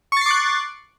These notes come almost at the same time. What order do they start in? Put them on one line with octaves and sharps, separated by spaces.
C#6 A6 C7 D6 F#6